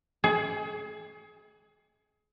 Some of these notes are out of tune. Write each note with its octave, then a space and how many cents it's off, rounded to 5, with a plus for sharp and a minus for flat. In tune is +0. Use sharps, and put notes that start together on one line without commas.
G#4 +30